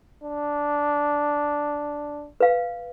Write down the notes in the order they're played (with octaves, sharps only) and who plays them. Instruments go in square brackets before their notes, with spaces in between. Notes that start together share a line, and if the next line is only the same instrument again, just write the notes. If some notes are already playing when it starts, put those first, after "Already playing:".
[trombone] D4
[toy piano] B4 F5